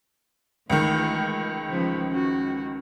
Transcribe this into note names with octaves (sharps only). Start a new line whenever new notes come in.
C#2 D#3 E3 A3
C#3 F3 B4
C#4 F#4